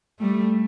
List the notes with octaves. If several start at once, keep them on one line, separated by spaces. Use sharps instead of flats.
G3 A3